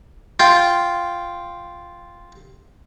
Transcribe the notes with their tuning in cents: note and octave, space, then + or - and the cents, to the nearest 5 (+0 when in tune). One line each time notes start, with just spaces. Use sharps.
F4 +0 G5 +0